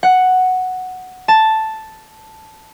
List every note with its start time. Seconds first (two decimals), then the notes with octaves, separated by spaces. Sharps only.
0.03 F#5
1.28 A5